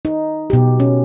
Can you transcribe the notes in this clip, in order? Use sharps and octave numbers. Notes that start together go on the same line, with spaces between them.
D#4
B2 G4
C#4